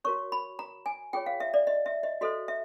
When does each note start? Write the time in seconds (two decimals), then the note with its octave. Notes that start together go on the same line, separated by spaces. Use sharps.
0.04 F#4 A#4 C#5 C#6
0.32 B5
0.59 A#5
0.86 G#5
1.13 F4 G#4 C#5 G5
1.26 F5
1.40 E5
1.54 D5
1.67 D#5
1.86 E5
2.03 D#5
2.21 F#4 A4 C5 D#5
2.48 E5